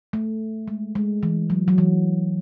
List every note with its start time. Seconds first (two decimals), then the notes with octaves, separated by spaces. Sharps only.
0.13 A3
0.68 G#3
0.95 G#3
1.23 E3
1.50 F#3
1.68 F#3
1.78 E3